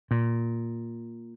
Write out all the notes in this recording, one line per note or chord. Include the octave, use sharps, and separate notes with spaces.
A#2